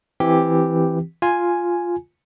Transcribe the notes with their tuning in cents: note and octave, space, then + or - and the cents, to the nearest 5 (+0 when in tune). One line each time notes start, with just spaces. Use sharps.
E3 +0 C4 +0 G4 +0
F4 +0 G#5 +0